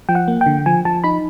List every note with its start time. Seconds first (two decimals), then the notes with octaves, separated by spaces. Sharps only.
0.09 F3 G5
0.15 F#5
0.28 A#3
0.41 G5
0.46 D3
0.66 F3 G#5
0.85 F3 A5
1.04 D#4 B5